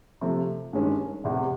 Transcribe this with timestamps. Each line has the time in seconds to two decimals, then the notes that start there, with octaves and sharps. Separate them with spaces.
0.21 C3 F3 A3
0.73 G2 D#3 G#3 C#4
1.24 F1 E2 C3